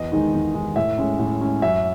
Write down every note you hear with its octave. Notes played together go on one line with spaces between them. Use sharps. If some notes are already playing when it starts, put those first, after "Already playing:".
Already playing: E2 D#5
D#3 G#3 D#4
E2
D#3 G#3 D#4
A2 E5
G#3 C#4
A2
G#3 C#4
F#2 E5